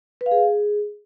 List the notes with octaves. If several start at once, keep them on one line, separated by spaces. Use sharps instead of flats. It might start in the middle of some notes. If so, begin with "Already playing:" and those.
B4
F5
G#4